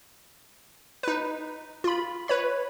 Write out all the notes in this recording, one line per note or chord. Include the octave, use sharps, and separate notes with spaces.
D#4 B4
F4 B5
B4 C#5 B5